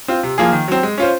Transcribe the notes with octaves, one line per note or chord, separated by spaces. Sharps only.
C4 F4
C3
F3 A#3 F4 G#4
D#3
F#3 C4
G#3
C#4 F4 C5